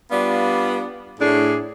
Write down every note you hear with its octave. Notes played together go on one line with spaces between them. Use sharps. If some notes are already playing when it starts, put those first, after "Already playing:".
G3 B3 D4 F4 D5 F5
A2 D4 G#4